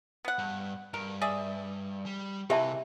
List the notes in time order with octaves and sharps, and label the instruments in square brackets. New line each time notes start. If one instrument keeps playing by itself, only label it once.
[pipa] B3 F#5
[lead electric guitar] G2
[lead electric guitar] G2 [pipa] A#4
[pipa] G#4 D5 E5
[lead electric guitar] G3
[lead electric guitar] C3 [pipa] E3 A#3 [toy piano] G4 E5 A5